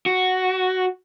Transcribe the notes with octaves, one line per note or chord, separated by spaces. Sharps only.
F#4